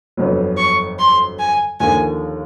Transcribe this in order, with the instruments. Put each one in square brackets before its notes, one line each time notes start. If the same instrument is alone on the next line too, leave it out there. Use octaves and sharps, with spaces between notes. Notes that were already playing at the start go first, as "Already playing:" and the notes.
[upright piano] G1 F2 D3 F#3 B3
[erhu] C#6
C6
G#5
[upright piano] D#2 D3 F3 A#3 [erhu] G#5